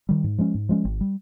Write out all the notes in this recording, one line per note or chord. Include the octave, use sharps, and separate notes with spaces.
D#3 G3
G#2
F3 G#3 C#4
G#2
F3 G#3 C#4
G#1
G3